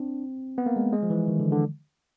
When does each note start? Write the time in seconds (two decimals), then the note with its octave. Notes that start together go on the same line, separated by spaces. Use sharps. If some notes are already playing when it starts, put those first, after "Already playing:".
Already playing: C4 D4
0.58 B3
0.66 A#3
0.76 G#3
0.93 G#3
1.03 F3
1.10 E3
1.28 D#3
1.40 D3
1.52 D3